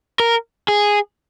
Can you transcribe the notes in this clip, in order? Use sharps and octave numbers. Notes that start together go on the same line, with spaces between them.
A#4
G#4